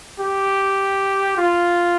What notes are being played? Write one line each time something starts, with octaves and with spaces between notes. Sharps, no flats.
G4
F4